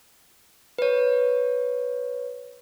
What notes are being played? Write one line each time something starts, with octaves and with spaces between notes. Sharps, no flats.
B4 C#5